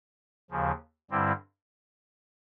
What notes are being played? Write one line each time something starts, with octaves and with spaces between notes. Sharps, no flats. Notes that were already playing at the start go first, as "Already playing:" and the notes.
D#2 C#3 F3
G2 D3 G3 C4 E4